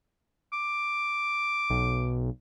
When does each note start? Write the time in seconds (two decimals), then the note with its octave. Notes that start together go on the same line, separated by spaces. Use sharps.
0.53 D6
1.70 B1